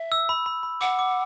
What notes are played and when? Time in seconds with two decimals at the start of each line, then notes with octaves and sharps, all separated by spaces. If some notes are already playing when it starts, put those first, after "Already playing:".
Already playing: E5
0.12 E6
0.29 B5
0.46 B5
0.63 B5
0.81 F#5 D6
0.99 D6